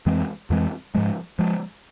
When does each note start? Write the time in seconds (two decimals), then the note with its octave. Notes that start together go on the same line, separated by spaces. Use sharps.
0.06 F2 E3 G#3 C4
0.50 F2 E3 G#3 C4
0.95 G#2 F3 G#3
1.39 F3 G#3